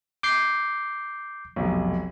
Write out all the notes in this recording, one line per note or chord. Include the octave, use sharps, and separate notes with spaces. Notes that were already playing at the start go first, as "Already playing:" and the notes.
D6 G6 C7
F1 B1